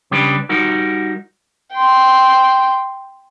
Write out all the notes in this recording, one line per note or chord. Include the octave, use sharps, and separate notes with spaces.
C#3 G3 D4 G4 B4
G3 D#4 F#4 A#4
G5 C6